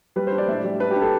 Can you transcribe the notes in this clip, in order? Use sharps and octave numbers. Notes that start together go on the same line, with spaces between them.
G3 B4
C5
D4
D5
A2 E5
G3 D5
D4 B4
G4
D4
A4